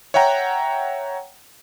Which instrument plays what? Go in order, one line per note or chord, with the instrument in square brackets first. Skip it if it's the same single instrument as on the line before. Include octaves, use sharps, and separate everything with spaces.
[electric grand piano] C#5 E5 F#5 G5 A#5